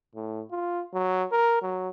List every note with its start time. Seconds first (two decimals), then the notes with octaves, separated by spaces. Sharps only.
0.15 A2
0.51 F4
0.94 F#3
1.32 A#4
1.62 F#3